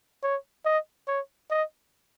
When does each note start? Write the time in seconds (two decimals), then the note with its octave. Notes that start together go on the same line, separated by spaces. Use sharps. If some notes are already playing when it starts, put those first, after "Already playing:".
0.23 C#5
0.65 D#5
1.08 C#5
1.50 D#5